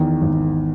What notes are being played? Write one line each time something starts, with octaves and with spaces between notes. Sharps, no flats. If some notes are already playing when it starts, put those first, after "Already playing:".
Already playing: E2 D#3
G#1